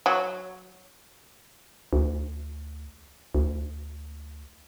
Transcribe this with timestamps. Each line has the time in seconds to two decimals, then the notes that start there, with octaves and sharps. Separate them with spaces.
0.06 F#3
1.93 D2
3.35 D2